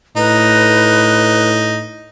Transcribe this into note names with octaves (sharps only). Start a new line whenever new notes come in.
A2 D#4 B4